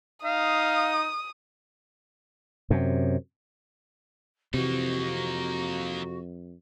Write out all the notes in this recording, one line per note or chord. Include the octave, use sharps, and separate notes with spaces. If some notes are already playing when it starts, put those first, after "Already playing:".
D#4 F5 D#6
F#2 C3
F2 C3 E3 A#3 D#4 F#4